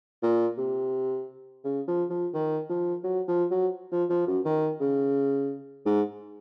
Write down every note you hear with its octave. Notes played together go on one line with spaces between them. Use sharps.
A#2
C3
C#3
F3
F3
D#3
F3
F#3
F3
F#3
F3
F3
F#2
D#3
C#3
G#2